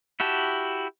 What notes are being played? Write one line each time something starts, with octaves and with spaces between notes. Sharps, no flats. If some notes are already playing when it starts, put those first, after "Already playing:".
E4 F#4 G4 A5